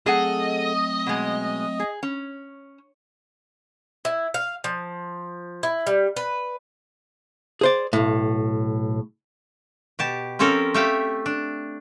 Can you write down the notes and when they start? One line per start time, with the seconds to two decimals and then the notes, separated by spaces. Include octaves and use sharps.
0.06 F#3 A3 C4 G#4 A4 D#5 F#5
1.07 B2 G#3
1.80 G#4
2.03 C#4
4.05 E4
4.34 F5
4.64 F3
5.63 E4
5.87 G3
6.16 B4
7.61 G#4 C5 D5
7.93 B1 A2
9.99 B2 G4 A5
10.39 F3 C4 C#4 A4 A#4
10.74 A3 G4 E5 F5 G5
11.26 D4